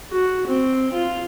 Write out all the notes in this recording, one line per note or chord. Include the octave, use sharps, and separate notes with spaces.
F#4
C4
F4